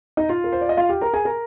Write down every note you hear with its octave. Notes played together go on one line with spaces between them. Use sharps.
D#4 D#5
F4 F5
A#4
C5
D5
D#5
F4 F5
G4 G5
A#4 A#5
G#4 G#5
A#4 A#5